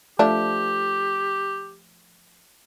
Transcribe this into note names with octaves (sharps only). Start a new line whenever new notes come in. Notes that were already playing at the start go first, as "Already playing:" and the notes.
F3 A3 D4 G4